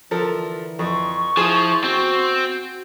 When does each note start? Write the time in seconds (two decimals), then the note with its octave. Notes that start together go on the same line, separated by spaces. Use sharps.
0.11 D3 E3 F3 A4 A#4
0.79 F2 C#6
1.37 F3 E4 F4 G#4 D#6
1.84 C4 F#4